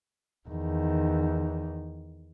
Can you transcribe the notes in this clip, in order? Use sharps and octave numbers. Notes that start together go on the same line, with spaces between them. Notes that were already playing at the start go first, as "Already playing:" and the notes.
E2 D#3